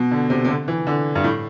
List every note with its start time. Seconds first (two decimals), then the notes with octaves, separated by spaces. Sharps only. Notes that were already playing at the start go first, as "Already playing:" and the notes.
Already playing: B2
0.11 D3
0.30 C3
0.45 C3
0.48 D3
0.68 E3
0.87 D3
1.15 G2
1.24 A2